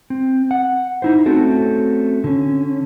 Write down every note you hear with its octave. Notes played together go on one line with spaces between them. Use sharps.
C4
F#5
D#4 E4 C5
A3 C4 C#4 F#4 A4
D3 C#4